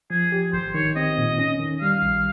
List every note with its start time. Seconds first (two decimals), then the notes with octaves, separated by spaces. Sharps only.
0.10 F3 G#4
0.32 G4
0.53 G#1 C5
0.74 D#3 C#5
0.96 C4 D#5
1.18 A#2
1.38 C#4
1.60 D#3
1.81 G3 F5
2.02 A#1